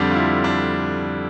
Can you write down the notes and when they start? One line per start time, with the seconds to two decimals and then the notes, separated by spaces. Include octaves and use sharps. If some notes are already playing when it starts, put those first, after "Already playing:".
Already playing: F2 D3 G3 D4
0.11 F4
0.15 E4
0.44 D4